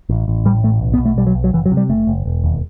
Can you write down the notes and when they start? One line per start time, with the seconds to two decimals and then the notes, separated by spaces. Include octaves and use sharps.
0.09 A1
0.28 A1
0.45 A2 G3
0.63 A1 A3
0.81 B1
0.94 B3
0.99 B2
1.05 A3
1.17 B1 G3
1.27 F#3
1.35 B1
1.44 F#3
1.53 F#1 E3
1.66 F#3
1.72 C3
1.77 G3
1.89 F#1 A3
2.07 F#1
2.25 E1
2.44 D#2